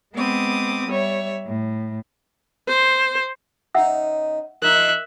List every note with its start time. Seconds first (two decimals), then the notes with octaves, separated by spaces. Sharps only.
0.14 G#3 B3 C4 D6 D#6
0.89 G3 C#5 E5
1.46 A2
2.68 C5
3.75 C#3 D#4 E5 F#5 E6
4.62 F3 D#4 A#4 E5 F#6